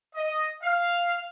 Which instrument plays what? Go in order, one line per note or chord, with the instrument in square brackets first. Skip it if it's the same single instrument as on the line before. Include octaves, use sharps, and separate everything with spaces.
[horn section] D#5
F5